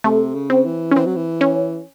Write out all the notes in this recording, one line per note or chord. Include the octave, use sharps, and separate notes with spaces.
C3 A3
C#3
C4
E3
C#4
E3 C4
F#3
E3
C#4